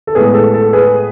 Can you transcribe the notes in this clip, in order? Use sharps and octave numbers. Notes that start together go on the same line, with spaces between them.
A4
A2 G#3 B3 G#4
A4
A4
G#4 B4